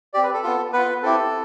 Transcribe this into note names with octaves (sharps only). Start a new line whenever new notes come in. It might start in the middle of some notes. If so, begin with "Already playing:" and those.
C4 G4 D5
B4
A4
B3 F4
B3 F4 B4
C4 E4 G4 A4